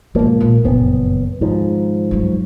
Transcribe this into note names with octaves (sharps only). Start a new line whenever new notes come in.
G#2 B2 F3 A#3
D#1 A#1
F#1 F2 A#2 B3
G#2 D#3 F3
G2 F#3